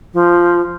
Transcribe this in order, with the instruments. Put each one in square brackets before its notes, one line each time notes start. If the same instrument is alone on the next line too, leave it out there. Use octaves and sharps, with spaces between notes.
[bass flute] F3